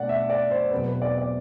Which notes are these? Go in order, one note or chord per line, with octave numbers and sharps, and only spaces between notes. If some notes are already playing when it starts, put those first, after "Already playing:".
Already playing: B2 A3 D4 D5 F#5
E5
D5
C5
E2 B2 F#3 C4 B4
B4
D5
D5